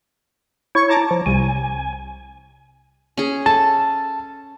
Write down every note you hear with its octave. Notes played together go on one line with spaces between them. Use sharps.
E4 C#5 C#6
A5 A#5 D6
F3
C2 G#5
C#4 G#4
A4 A5